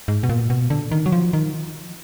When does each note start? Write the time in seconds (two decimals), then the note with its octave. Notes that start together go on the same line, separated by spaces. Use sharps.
0.08 G#2
0.23 B2
0.29 A#2
0.50 B2
0.70 D3
0.91 D#3
1.06 F#3
1.12 F3
1.33 D#3